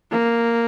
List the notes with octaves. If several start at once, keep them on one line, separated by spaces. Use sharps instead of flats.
A#3